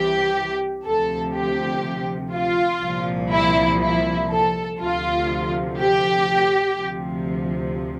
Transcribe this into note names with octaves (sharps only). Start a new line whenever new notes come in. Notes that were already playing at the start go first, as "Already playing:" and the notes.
Already playing: C2 C3 E3 G4
D2 C3 F3 A4
G4
F4
C2 A#2 F3
E4
E4
A4
D2 C3 F3 F4
G4
D2 C3 F3